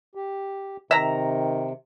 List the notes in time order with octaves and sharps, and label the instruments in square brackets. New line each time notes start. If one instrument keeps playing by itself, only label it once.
[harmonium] G4
[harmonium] C3 [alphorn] D#3 [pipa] E5 A#5